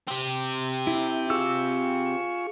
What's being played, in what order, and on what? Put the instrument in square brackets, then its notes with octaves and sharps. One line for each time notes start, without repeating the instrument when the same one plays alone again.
[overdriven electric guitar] C4 G4
[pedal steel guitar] E4
[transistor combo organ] F4 G#4 C#6 [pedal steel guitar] E6